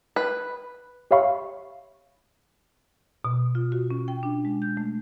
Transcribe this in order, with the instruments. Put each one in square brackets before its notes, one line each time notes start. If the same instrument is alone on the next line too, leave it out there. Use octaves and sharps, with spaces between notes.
[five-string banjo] B4
[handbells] G4 C#5 E5 F5 B5 C#6
[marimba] B2
F4
F#4
C#4
G5
D4
G#3
G6
A3